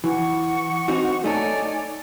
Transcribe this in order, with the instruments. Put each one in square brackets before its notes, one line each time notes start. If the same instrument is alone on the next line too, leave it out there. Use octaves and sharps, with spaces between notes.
[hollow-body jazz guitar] E3 [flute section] F#5 C#6 D6
[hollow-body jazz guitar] C4 D#4 F#4
[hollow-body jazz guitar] A3 D#4 A4 [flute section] C#5 D5 G#5